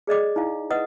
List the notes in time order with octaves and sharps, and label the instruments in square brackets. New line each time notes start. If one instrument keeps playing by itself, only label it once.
[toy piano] G#4 D5 D#5 D6
D#4 E4 F5
B4 D#5 F#5 D#6